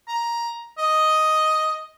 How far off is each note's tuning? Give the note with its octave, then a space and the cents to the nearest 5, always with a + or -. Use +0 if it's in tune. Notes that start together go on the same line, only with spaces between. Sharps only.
A#5 +10
D#5 +5